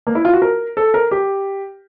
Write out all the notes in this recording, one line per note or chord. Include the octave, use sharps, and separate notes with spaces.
A#3
E4
F4
F#4
A#4
A4
A#4
G4